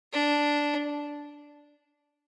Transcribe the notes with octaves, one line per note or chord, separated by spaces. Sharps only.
D4